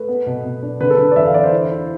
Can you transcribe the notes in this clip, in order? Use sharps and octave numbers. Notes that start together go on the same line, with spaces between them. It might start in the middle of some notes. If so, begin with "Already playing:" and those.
Already playing: A3 B4
B3
B2
B2
D4
D3 B4
A4
D3 B4
D5
E2 E5
F5
E2 D5
C5
E4
E4